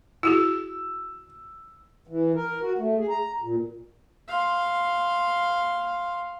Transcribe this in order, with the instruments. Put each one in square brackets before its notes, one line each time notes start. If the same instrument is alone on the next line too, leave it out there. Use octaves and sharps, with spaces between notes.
[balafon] E4 F#4 G#4 [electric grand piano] E6
[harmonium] E3
A#4
F#4
A3
G#4
A#5
A#2
[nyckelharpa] F5 C6